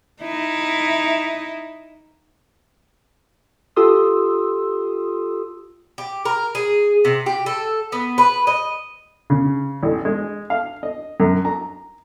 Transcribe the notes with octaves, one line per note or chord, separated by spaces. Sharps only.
D#4 E4
F4 G4 A4 C6 D#6 E6
G4
A#4
G#4
C3
G4
A4
B3
B4
D#5
C#3
A1
G#3
F5
D#5
F#2
A#5